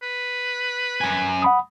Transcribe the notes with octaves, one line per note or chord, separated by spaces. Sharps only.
B4
F#2 G#5
F#5 B5 D#6